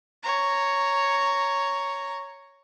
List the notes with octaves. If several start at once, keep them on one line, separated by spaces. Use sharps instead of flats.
C#5 A#5